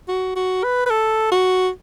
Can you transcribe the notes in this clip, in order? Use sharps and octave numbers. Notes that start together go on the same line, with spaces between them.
F#4
F#4
B4
B4
A4
F#4